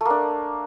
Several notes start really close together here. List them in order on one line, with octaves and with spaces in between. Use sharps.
A3 A#3 D4